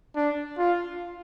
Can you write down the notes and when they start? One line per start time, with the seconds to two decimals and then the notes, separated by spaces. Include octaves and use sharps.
0.16 D4
0.58 F4